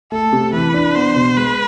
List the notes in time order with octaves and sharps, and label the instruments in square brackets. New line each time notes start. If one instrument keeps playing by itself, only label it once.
[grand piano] A3 [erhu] A4
[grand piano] C3
[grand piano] E3 [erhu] B4
[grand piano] D4
[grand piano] B3 [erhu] C5
[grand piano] B2
[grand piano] G#3 [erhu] B4